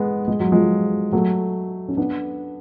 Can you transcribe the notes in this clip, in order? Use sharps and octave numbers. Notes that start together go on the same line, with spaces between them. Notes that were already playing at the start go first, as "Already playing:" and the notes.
Already playing: G#3 B3
G#3
F#3
F3 G#3
F#3 A3
C#4
B3 D4